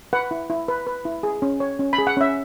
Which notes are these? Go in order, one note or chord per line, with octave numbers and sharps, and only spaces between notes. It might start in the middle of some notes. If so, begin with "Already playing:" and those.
B4 F#5
E4
E4
B4
B4
E4
G#4
C#4
C#5
C#4
B5
G#4
F#5
C#4 E5